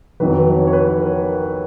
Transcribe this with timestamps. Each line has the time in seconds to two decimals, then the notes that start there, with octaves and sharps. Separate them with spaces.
0.20 F2 D#3 F#3 B4
0.38 B4
0.56 C#5
0.67 C#5
0.73 B4
0.99 A#4